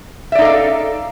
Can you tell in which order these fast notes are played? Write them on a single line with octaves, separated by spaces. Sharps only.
E5 D5 D#4 A4 F5